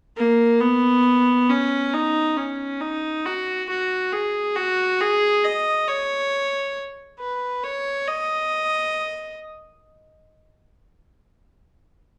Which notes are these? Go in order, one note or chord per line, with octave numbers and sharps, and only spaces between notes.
A#3
B3
C#4
D#4
C#4
D#4
F#4
F#4
G#4
F#4
G#4
D#5
C#5
B4
C#5
D#5